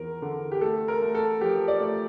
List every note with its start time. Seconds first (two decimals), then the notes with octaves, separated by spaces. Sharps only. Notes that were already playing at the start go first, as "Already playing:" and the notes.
Already playing: E2 F3 A#4
0.22 D3
0.52 G4
0.61 A3 A4
0.88 A#4
1.01 A3
1.15 A4
1.41 F3 G4
1.68 D5
1.80 A3